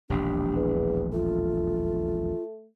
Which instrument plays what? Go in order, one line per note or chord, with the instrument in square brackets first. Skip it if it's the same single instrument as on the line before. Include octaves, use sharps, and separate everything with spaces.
[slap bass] E1 A#1 D#2 [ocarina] D4 [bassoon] G4
[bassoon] E2
[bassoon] A3 [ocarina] F4